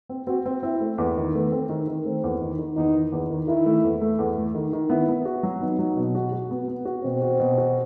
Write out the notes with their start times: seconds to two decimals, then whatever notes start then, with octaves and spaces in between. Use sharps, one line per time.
0.09 C4
0.27 C4 F#4
0.46 C4
0.63 C4 E4
0.81 A3
0.98 E2
1.17 D#3
1.34 A3 B3
1.52 C4
1.69 D#3
1.88 D#3
2.05 A3 C4
2.24 E2
2.41 D#3
2.59 D#3
2.76 E2 D#4
2.94 D#3
3.12 E2
3.30 D#3
3.48 D#3 E4
3.66 A3
3.84 E2
4.01 A3
4.19 E2
4.37 A3
4.55 D#3
4.73 D#3
4.90 B3 E4
5.09 B3
5.25 F#4
5.43 F#3
5.61 B3 D#4
5.79 F#3
5.97 B2
6.15 F#4
6.32 F#4
6.51 B3
6.68 B3
6.85 F#4
7.04 B2 C4
7.22 F#4
7.40 B2
7.58 F#4